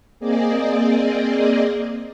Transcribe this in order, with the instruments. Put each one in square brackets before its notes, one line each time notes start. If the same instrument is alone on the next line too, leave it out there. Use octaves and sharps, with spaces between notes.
[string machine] A#3 C4 G#4 D5 D#5